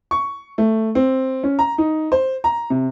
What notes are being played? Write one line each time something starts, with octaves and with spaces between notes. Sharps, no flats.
C#6
A3
C4
C#4
A#5
D#4
C5
A#5
C3